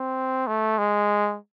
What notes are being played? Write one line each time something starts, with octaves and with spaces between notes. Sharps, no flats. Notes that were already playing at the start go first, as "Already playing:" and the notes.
Already playing: C4
A3
G#3